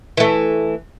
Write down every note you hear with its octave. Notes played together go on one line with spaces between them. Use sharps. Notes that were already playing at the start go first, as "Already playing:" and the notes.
E3 A3